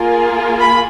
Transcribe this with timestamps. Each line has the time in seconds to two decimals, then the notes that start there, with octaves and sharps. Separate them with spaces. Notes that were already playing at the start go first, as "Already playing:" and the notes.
Already playing: A#3 F4 G#4
0.59 B5